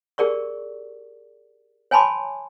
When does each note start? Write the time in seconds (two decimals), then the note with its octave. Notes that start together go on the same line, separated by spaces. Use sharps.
0.18 G4 G#4 A#4 D5 C#6
1.91 C#5 G#5 A5 B5 C6 D6